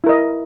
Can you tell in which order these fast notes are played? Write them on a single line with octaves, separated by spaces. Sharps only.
E4 A#4 D#5